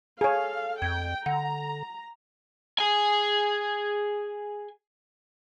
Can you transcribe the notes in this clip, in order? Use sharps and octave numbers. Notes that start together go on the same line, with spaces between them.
G#4 A4 C#5 F5
F2 G5 G#6
D3 F#5 A#5
G#4 G#5